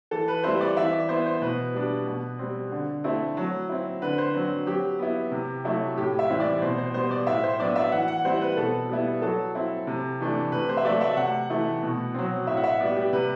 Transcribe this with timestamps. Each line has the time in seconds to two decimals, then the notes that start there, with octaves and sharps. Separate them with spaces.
0.11 E3 A4
0.28 B4
0.44 G3 C4 E4 C5
0.61 D5
0.77 E3 E5
0.93 D5
1.09 B3 E4 C5
1.26 C5
1.42 B2 B4
1.74 G3 D4
2.07 B2
2.39 G3 C4
2.72 D3
3.04 A3 C4 E4
3.37 F#3
3.69 C4 E4
4.02 D3 B4
4.18 C5
4.35 F#3 C4
4.67 F#3 G4
4.99 B3 E4
5.32 C3
5.64 F#3 A3 E4
5.97 A2 G4
6.19 E5
6.30 E3 G3 C4 E4
6.40 D5
6.61 B2 C5
6.78 C5
6.94 G3 B3 C5
7.11 D5
7.27 A2 E5
7.44 C5
7.59 F#3 B3 D4 D5
7.76 E5
7.92 E3 F#5
8.08 F#5
8.25 G3 C4 E4 C5
8.41 B4
8.57 B2 A4
8.89 G3 B3 E4
9.22 F#3 A4
9.55 C4 E4
9.87 C3
10.20 E3 A3 D4
10.52 C3 B4
10.69 C5
10.77 E5
10.85 F#3 A3 D5
11.01 E5
11.17 C3 F#5
11.50 E3 A3 E4
11.83 B2
12.14 F#3 C4
12.47 A2 E5
12.57 F#5
12.64 E5
12.80 G3 B3 D5
12.96 G4
13.13 C3 B4